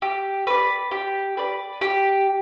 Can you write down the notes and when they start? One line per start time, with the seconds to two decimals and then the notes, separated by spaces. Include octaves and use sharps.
0.02 G4
0.47 B4 D5
0.91 G4
1.37 B4 D5
1.81 G4